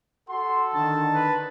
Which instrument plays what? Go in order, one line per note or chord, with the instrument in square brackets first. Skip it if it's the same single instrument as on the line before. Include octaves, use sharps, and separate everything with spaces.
[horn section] F#4 F#5 C6 [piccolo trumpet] A4
[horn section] D3 D#3 [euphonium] D4 [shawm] A5
[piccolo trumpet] B4